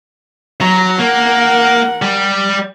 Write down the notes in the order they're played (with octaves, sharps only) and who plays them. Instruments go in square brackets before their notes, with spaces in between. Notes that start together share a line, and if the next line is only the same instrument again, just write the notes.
[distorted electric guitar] F#3 [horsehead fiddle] A#5
[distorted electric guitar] A#3 [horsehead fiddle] A#4 F#5
[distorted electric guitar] G3 G4